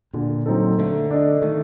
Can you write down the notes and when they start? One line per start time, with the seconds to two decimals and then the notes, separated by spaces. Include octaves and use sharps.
0.14 A#2 D3
0.46 F#3 C4 D#4 A4
0.78 D3 A3
1.11 D4 A4 D#5
1.42 D#3 A3